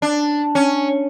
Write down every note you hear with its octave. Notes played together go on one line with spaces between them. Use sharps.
D4
C#4